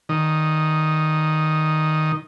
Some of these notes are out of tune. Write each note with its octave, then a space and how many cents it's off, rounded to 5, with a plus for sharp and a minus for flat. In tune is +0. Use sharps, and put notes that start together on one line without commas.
D#3 +0 D#6 -10